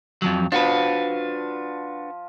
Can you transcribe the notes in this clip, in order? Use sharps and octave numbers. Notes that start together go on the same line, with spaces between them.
F2 F3 F#3
F3 D4 F#4 B4